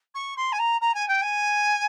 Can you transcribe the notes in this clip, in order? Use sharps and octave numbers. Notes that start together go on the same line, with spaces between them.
C#6
C6
G#5
A#5
A#5
G#5
G5
G#5